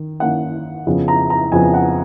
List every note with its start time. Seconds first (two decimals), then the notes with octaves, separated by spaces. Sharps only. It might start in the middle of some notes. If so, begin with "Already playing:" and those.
Already playing: D#3
0.20 D#3 A#3 C#4 F#5
0.87 F2 C#3 F3 B3
1.08 A#5
1.30 A#5
1.52 F2 C#3 F3 B3 G#5
1.74 F#5